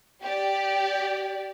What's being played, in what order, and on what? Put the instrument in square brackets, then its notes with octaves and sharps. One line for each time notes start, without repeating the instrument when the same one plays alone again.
[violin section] G4 D5